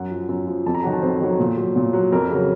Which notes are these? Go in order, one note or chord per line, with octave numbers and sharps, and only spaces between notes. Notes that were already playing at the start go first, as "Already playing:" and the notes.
Already playing: F#2 F#5
F3
F#2
F3
F2 A5
A#5
D#3 F#3 F#5
A5
F2 C5
D#3 F#3
A#2
F#3
A#2
F#3
F2 A#4
C#3 F#3